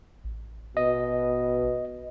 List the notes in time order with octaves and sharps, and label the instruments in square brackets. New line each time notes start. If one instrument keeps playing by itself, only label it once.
[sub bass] A1
[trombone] B2 [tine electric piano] D#5